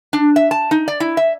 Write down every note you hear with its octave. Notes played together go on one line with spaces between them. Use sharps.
D4
E5
A5
D#4
D5
E4
E5